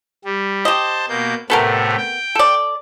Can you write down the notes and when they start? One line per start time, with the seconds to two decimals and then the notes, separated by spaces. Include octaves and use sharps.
0.24 G3
0.65 G4 C5 D#5 A5
1.09 B2 A#3 G6
1.50 A2 C3 A3 B3 A4 A#4
1.97 G5
2.35 A4 D5